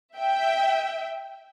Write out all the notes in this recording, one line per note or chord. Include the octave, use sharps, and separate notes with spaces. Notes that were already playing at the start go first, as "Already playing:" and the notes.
E5 G5